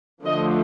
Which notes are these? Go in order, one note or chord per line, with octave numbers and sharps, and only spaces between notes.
D3 F3 A3 D#5